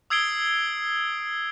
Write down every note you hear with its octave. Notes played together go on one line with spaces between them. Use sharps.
D#6 E6 G#6 C7 D7 G7